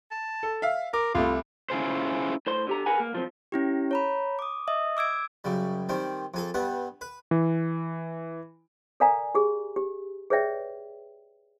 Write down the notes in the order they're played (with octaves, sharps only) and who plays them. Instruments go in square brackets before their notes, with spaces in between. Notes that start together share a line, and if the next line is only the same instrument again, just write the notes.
[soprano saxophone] A5
[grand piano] A4
E5 F5
[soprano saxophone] A#4 [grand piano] D6
[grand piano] C2 A3 [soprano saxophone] F4
[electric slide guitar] C#4 E4 F4 G#4 C5
[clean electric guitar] A2 C5 C6
D3 G4 A#5
G#4 A#4 B4 F#5 G#5
A#3
B1 F3 C4
[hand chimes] C#4 E4 G4
C#5 A#5 B5
D6 D#6
D#5 E5 D#6
D6 E6 G#6 D7
[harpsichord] F#2 C#3 G3
D#3 G3 C4
F2 G#4 A4
G2 G3 B3 F#5
B4
[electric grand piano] E3
[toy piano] A4 A#4 D5 F5 G#5 A#5
G4 G#4
G4
G#4 B4 C#5 D5 E5 G5